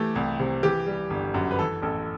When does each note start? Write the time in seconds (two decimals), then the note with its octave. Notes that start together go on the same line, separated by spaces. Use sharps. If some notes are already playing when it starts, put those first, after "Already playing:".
Already playing: E3 A3 G4
0.16 C2
0.40 C3
0.63 E3 G4
0.86 G3
1.10 G1
1.34 F#2
1.51 B4
1.59 E3 A4
1.82 A1 A4